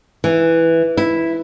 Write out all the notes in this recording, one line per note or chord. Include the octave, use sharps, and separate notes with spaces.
E3
E4